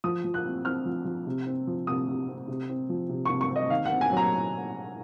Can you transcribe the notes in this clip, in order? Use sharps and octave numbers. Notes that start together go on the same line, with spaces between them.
F3 D#6
F3
F#6
C4
C4 F6
F3
F3
C3
C4
F3
C3 D#6
C3
C4
C3
C4
F3
C3
C3 C#6
C#6
C4
D#5
D#3 F5
F#5
C4
G#5
F#3
A#5